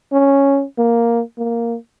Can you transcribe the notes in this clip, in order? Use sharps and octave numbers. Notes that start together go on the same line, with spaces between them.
C#4
A#3
A#3